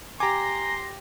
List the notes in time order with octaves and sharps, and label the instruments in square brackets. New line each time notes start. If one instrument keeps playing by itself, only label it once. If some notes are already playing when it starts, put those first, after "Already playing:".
[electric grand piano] G4 G5 D6 [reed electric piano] G#5 A#5 [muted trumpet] C6 [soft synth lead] A#6